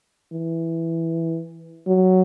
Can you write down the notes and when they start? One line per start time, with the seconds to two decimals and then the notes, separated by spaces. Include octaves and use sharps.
0.32 E3
1.87 F#3